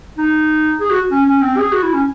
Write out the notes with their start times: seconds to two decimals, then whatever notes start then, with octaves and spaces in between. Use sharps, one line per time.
0.18 D#4
0.80 G#4
0.90 F#4
1.11 C#4
1.26 C#4
1.41 C4
1.58 G#4
1.72 F#4
1.83 E4
1.94 C#4